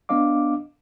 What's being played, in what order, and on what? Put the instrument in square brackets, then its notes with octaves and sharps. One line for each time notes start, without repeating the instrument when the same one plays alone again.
[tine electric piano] B3 D4 D#5 F5 D6